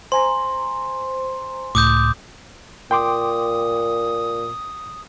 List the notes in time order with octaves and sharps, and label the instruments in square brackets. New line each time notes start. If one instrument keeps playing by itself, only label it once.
[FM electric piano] C5 G#5 A#5 [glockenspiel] C6
[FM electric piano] C#2 A2 [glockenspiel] D6 D#6 G6
[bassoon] A#2 [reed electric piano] G5 C6 D6 [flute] D#6